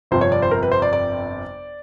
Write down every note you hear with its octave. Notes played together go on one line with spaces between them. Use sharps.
G1 F2 C3 F3 C5
C#5
D5
C5
A#4
B4
C5
D5
D5